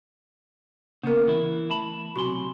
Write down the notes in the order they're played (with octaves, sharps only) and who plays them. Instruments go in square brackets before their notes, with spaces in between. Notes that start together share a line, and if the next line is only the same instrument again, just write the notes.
[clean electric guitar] C#3 B3 [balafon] A#3 A#4
[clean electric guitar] E3 E4
A3 A5 B5
[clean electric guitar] B1 C3 C6 [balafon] F#4 G#5